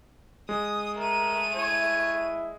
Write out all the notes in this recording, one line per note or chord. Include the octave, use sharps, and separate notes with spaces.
G#3 D#6
A3 A#4 D#7
E4 C#5